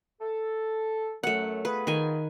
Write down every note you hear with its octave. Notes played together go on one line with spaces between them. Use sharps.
A4
F#2 F#3 A3 F#5
B3 F4 G#4 B4
D#3 G#5